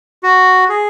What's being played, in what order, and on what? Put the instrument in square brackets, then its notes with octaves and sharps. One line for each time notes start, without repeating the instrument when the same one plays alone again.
[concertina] F#4
G#4